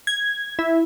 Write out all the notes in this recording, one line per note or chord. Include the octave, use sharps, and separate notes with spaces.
G#6
E4